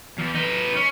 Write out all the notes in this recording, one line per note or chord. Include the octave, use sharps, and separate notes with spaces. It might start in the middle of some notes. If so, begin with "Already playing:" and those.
E2
D#4 B4
C#4